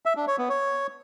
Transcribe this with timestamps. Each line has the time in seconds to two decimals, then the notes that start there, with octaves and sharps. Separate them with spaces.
0.05 E5
0.16 D4
0.27 C#5
0.38 B3
0.49 C#5